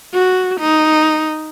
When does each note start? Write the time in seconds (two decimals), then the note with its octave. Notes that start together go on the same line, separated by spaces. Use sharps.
0.14 F#4
0.60 D#4